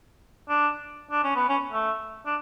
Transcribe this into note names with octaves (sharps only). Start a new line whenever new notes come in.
D4
D4
C#4
B3
C#4
A3
D4